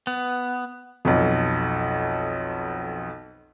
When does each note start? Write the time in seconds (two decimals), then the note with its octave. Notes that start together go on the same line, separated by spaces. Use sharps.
0.07 B3
1.05 B1 F2